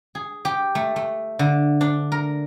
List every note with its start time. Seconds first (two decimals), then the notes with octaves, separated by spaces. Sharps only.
0.15 G#4
0.45 G4
0.75 A3
0.96 A3
1.39 D3
1.81 D4
2.12 A#4